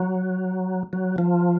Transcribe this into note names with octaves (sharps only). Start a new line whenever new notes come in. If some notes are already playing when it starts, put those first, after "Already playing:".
Already playing: F#3
F#3
F3